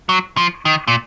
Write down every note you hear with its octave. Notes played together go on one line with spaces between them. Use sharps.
F#3
F3
D#3
A#2